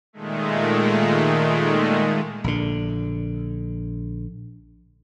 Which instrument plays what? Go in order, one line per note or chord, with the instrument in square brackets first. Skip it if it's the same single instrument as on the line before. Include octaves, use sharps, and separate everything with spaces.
[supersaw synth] A#2 D#3 G#3 A3
[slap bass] A#1 D3